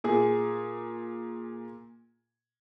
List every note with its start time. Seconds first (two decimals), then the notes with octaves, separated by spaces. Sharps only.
0.04 A#2 G#4